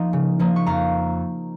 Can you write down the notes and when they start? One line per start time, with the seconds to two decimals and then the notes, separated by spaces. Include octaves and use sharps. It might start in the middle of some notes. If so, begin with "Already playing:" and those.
Already playing: F3 A#3 D#4 D#5
0.13 C#3
0.39 F3 A#3 D#4
0.56 C#6
0.66 F2 F5 A#5